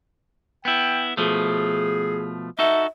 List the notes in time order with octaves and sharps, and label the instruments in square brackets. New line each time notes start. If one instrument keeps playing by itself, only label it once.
[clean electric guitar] B3 E4 [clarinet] G5
[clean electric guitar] B2 F3 A3 [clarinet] G#4
[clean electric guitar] D#4 F#4 A4 [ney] E5